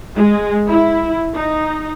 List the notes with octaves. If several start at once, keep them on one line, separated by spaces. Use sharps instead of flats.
G#3
E4
D#4